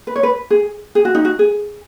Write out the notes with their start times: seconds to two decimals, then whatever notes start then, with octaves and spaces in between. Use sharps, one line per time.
0.07 B4
0.16 C#5
0.23 B4
0.51 G#4
0.95 G#4
1.05 F#4
1.15 D#4
1.25 F#4
1.39 G#4